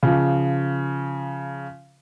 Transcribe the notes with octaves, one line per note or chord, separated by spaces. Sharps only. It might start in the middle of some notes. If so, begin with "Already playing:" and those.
C#3 F3